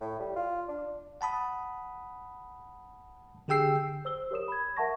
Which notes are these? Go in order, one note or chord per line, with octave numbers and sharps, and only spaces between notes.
A2
G3
F4
D4
F#5 A5 B5 D#6
D3 G4 G#4 G5 E6 C7
C5 E6 G7
G4 A#4 C#5 D#6 E7
B5 G#6
A#4 E5 F#5 A5 C#6 A#6